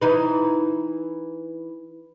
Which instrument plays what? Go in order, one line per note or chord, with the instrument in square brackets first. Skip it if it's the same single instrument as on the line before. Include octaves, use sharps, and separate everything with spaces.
[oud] E3 D#4 B4